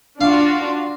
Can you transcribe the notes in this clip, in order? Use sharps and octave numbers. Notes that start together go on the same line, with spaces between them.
D4 F4 F#4 F5